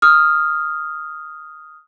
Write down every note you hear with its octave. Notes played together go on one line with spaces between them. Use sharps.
D#6 F6